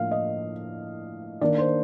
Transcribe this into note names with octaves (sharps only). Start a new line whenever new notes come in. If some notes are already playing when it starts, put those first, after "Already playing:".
Already playing: A2 F3 A#3 D4 F5
D#5
D#3 A#3 D4 D5
C5